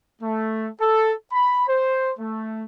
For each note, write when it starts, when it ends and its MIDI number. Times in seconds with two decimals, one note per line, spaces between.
0.22 0.68 57
0.81 1.12 69
1.32 1.63 83
1.68 2.11 72
2.19 2.64 57